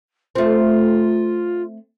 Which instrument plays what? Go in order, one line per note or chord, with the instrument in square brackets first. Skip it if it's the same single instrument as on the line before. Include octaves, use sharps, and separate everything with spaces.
[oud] A3 C4 [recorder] F4